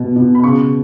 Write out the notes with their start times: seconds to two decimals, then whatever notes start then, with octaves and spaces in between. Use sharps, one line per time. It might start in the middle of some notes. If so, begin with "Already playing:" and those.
Already playing: B2 B3
0.16 B2
0.35 B5
0.43 C#3 C#6